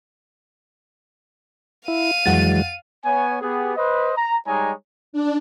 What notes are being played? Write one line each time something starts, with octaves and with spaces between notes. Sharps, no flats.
E4 F5 D#7
F2 E3 F#3 G#3 F#5 A6
B3 C#5 G#5
B3 G4 G#4
B4 C5 D#5
A#5
G3 G#3 D#4 C#5 G#5 A#5
D4